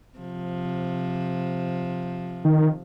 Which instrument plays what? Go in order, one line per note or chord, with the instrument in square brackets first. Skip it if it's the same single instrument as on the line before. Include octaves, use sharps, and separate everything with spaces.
[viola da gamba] C3 F3
[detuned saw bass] D#3